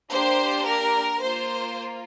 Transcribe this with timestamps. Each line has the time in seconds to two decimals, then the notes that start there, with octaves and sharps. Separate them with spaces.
0.11 A#3 D4 G4 C5
0.66 A#4
1.22 A#3 F4 C5